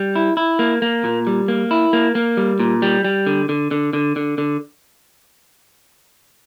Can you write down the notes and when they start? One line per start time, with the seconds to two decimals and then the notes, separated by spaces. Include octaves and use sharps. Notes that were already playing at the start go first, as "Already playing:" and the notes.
Already playing: G3
0.16 E4
0.37 E4
0.59 A#3
0.82 A#3
1.04 A#2
1.27 G3
1.48 A#3
1.71 E4
1.93 A#3
2.15 A#3
2.37 G3
2.60 A#2
2.82 G3
3.04 G3
3.27 D3
3.49 D3
3.71 D3
3.93 D3
4.16 D3
4.38 D3